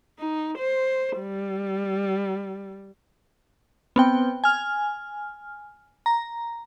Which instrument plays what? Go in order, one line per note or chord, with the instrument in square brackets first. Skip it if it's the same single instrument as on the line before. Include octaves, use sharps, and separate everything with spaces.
[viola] D#4
C5
G3
[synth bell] B3 C4 G5
G#5 F6
A#5